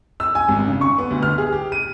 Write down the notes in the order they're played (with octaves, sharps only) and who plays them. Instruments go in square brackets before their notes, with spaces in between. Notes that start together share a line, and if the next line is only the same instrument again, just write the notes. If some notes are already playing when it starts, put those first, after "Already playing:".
[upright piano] E6
G#5
G#1
C#3
C#6
B3
D2
F6
G#4
G4
D#7